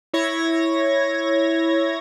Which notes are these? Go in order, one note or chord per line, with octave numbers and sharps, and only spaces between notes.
E4 C#5 G#6 A#6